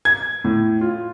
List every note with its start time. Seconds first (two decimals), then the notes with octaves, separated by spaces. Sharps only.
0.05 G#6
0.44 A2
0.81 F4